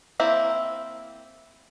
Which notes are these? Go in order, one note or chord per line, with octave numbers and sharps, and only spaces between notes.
A#3 C4 E4